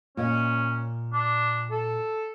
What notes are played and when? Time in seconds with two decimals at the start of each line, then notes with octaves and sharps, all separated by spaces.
0.17 A#2 C#4 D#5
1.13 D4
1.71 A4